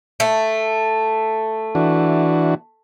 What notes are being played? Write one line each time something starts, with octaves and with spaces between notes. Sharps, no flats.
A3
E3 D4 F#4